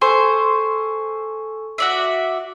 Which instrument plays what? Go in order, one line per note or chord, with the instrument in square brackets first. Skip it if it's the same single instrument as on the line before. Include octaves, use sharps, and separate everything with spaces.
[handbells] A4 G#5 C#6 [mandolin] C5
[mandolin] F#4 D5 E5